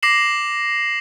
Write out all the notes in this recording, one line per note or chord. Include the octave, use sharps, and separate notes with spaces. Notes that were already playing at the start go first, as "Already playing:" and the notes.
D6 A#6 C7 E7 F#7